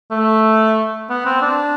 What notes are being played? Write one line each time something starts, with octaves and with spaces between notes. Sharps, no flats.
A3
B3
C4
D4